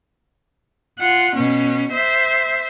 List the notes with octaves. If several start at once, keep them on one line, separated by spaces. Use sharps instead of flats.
F4 F#5
B2 C#4
C5 E5